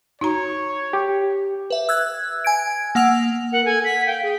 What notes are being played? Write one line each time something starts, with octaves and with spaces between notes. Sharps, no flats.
D#4 F#4 C#5 A#5
G4
B4 E5
E6 F#6 G#6
G#5 G#6 D7
A#3 F#5 E6 F7
A#4 F#5
A4 G#5
F#5 B6
F5 G5
G#4